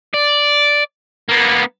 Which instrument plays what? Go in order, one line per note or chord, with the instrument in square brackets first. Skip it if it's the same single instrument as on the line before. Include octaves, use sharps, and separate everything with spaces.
[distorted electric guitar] D5
A#3 B3